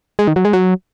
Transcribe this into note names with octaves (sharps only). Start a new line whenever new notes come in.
G#3
D#3
F#3
G#3
F#3